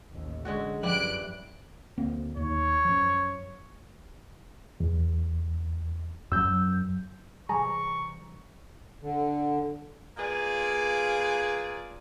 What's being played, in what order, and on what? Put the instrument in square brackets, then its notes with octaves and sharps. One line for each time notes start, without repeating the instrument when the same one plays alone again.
[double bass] A1 D#2
[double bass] D3 [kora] G#3 C#4 F#4
[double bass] F#2 [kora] E3 G3 E4 [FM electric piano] F3 [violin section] F#6 D7
[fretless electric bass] D2 A#3 C4
[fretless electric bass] D#2 [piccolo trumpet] C#5
[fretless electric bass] F#2 F3
[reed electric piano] E2
[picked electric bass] F#2 F#3 [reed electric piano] E6 G6
[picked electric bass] C3 E3 G3 [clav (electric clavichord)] G#4 [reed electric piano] A#5 [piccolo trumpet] C#6
[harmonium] D3
[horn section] A#3 F4 G#4 B4 D5